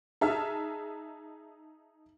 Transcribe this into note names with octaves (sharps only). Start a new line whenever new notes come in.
D#4 G#4 E5 A5 F6